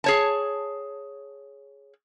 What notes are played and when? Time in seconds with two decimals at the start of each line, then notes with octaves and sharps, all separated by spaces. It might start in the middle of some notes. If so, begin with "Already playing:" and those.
0.04 G#4 C#5 A5